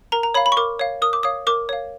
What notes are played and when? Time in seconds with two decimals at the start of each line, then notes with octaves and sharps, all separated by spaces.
0.12 A#4 A#5
0.23 A#5
0.34 C#5 F5 B5
0.46 B5
0.52 C#6
0.57 A#4 D6
0.79 C#5 F5
1.02 A#4 D#6
1.13 D6
1.23 C#5 F5 D#6
1.47 A#4 D6
1.69 C#5 F5